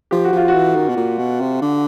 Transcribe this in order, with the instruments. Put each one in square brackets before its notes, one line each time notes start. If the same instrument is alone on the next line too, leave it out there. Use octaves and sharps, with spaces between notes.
[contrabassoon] F3 [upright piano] G4
[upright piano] F#4
[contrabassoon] F3 [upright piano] F4
[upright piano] F#4
[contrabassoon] E3
D#3
B2
A#2
B2
C3
D3